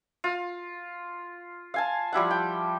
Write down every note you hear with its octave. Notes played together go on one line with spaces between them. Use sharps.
F4
F5 G#5 A5
F3 G3 E4 F#5
G5